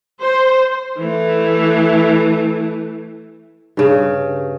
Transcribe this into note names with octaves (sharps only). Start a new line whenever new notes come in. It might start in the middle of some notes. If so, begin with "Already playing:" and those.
C5
E3 A3
G2 C#3